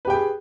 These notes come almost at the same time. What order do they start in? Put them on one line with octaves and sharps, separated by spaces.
B4 G4 G5 G#4